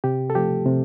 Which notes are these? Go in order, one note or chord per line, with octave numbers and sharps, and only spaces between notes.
C3 G4
A4
F3 A3 G4
C3